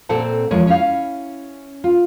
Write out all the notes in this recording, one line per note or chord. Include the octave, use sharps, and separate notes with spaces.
A#2 C4 A4 C5 F#5 A5
E2 F3 G#3 A#4 C#5
C#4 E4 F5
F4